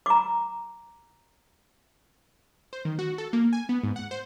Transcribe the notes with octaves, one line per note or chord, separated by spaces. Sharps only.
A#5 D6
C5
D#3
F#4
A4
A#3
G#5
B3
G#2
F#5
C5